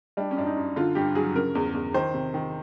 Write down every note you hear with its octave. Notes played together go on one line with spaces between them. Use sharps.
G3 D4
C#4
F#2 D4
D#4
F#2
D3 F4
G2 G4
F#3 G#4
C#3 A#4
E2
E2
D#3 C5
C3
D#3